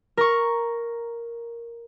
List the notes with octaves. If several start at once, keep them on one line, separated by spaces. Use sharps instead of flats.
A#4 C#6